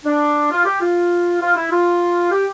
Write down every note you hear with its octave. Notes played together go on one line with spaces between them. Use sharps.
D4
F4
G4
F4
F4
E4
F4
G4